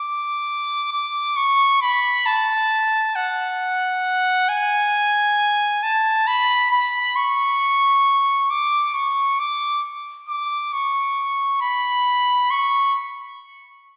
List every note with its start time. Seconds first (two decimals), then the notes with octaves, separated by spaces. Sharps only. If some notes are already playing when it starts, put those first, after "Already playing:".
Already playing: D6
0.93 D6
1.36 C#6
1.82 B5
2.26 A5
3.15 F#5
4.49 G#5
5.83 A5
6.27 B5
6.71 B5
7.16 C#6
8.50 D6
8.94 C#6
9.39 D6
10.28 D6
10.73 C#6
11.61 B5
12.51 C#6